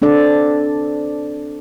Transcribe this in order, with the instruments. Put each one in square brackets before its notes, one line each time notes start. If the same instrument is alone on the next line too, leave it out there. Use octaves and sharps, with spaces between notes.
[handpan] C4 D4 A4 D5